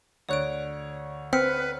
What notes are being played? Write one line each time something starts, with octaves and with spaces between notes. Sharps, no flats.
D2 C#5 D5 F#6 D7
C4 B4 F6 B6 C#7